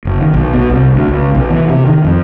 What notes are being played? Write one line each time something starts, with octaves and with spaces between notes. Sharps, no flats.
F#1
D#3
B1
B2
C2
D2
C#2
B1
E3
C3
D#3
F2